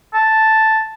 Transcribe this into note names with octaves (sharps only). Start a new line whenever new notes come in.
A5